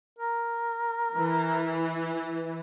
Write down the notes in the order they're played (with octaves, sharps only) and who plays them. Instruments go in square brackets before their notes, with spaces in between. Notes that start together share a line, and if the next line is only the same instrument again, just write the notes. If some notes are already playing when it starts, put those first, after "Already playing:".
[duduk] A#4
[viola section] E3